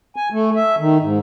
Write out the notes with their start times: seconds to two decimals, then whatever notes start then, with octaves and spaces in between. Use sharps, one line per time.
0.16 G#5
0.32 A3
0.56 E5
0.79 D#3
1.01 G#2